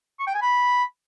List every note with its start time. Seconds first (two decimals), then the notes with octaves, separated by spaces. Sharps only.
0.20 C#6
0.27 G5
0.34 G#5
0.42 B5